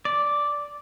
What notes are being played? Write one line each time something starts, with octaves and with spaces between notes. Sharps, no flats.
D5